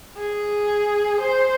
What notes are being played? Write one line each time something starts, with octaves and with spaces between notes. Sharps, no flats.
G#4
C5